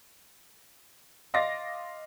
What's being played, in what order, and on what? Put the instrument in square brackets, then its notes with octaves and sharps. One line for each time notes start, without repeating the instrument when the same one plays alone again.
[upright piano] D#5 F5 C6 D6 A6 A#6